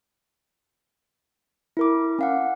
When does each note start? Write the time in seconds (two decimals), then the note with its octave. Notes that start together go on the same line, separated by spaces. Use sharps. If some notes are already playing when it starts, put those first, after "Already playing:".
1.77 E4 A#4 D6
2.19 C#4 F5 F#5